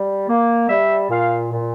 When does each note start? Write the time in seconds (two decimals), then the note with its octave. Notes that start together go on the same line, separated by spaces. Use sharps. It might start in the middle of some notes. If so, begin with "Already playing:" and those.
Already playing: G3
0.28 A#3
0.69 G3 E5
1.10 A#2 F5
1.51 A#2